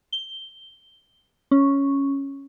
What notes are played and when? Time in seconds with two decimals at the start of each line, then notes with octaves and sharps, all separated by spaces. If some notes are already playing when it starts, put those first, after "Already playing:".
0.13 G7
1.51 C#4